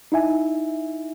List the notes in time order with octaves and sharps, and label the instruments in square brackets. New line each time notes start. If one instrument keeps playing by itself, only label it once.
[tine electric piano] D#4 E4 E5 G#5